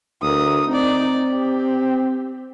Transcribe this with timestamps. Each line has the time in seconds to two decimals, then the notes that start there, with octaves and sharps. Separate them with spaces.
0.22 D2 A#4 D#6
0.68 C4 D#4 D5
1.32 G4